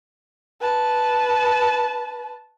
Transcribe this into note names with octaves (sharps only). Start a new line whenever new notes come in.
B4 A5